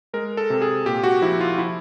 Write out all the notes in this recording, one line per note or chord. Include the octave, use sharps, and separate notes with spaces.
G#3 A#4
A4
C3
G#4
A#2 G4
F#4
F3 E4
F4
F3 E4